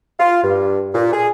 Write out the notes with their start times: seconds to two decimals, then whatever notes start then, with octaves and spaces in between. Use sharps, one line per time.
0.20 F4
0.43 G2
0.94 A#2
1.13 G#4